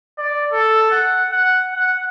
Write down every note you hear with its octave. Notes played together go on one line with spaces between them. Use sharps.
D5
A4
F#5
F#5
F#5